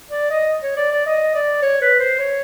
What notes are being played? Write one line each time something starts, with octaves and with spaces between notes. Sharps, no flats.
D5
D#5
C#5
D5
D5
D#5
D5
C#5
B4
C5
C#5